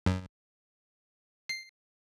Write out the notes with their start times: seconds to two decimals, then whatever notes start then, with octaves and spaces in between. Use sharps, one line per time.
0.06 F#2
1.49 C7